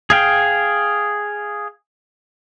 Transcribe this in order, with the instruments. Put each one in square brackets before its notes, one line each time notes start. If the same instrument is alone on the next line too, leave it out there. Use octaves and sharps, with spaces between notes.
[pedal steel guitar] G#4 F5 G5